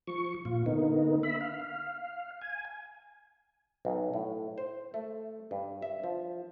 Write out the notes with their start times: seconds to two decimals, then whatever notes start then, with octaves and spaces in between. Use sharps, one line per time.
0.07 F3 C#6
0.45 A#2 F4
0.66 D3 A#3 B3 D#4
1.23 E5 B5
1.41 F5
2.42 G#5
3.85 B1
4.14 A2
4.58 C5
4.94 A3
5.51 G2
5.82 E5
6.04 F3